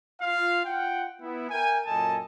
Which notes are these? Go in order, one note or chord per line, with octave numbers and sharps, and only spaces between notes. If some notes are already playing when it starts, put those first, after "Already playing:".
F4 F5
F4 F#5 G5
B3 E4
A#4 E5 G5 G#5
F#2 A#2 A4 D#5 G#5 A5